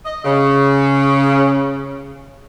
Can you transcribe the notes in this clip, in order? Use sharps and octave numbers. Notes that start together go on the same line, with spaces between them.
D#5
C#3